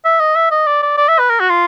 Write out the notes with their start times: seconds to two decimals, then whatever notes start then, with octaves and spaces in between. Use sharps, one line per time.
0.05 E5
0.20 D#5
0.36 E5
0.51 D#5
0.67 D5
0.82 D5
0.97 D5
1.08 E5
1.19 B4
1.30 A#4
1.40 F#4
1.49 F4